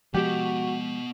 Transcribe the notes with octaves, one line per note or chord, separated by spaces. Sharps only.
F3 G#3 B3 F#4 G4 D#5